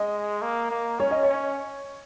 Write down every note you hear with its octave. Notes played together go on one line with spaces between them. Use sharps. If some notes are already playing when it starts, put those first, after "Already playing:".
Already playing: G#3 D#5
A#3
A#3
C#4 C#5
D#5
C#5
C#4